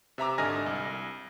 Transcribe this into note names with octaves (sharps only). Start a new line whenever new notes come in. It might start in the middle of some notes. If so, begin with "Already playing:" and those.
C3 E5 A#5 D6
G#1 D3 D#5 G#5 F6 A#6
C2